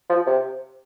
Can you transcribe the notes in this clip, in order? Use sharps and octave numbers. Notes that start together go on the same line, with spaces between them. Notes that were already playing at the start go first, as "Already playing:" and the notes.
F3
C3